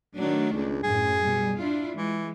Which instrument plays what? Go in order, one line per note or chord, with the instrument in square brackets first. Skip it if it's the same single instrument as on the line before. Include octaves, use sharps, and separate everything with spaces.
[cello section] D#3 A3 D4 [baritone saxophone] F#3
[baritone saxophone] C#2
[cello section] F#2 A2 [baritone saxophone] G#4
[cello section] B2 G3
D4 E4 F4
[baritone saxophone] E3 [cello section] G#3